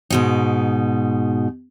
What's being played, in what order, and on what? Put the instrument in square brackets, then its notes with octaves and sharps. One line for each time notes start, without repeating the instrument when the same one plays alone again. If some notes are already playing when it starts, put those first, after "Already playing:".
[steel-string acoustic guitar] G#2 B2 D#4